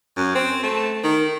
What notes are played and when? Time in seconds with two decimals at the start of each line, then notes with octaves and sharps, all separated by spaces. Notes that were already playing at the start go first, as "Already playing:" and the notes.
0.16 F#2
0.35 C4
0.63 A3
1.04 D#3